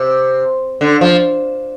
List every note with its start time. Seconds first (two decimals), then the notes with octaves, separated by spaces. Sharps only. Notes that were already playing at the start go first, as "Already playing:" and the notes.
Already playing: C3
0.81 D3
1.01 F3